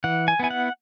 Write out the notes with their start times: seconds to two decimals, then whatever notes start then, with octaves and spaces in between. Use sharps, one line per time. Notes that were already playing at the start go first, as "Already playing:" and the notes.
0.04 E3 F#5
0.28 G#5
0.40 B3 E4 G#5
0.51 F#5